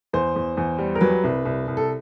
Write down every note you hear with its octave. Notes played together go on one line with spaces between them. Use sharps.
E2 C5
E2
E2
G3
A#4
F#3 B4
C2
C2
C2
A4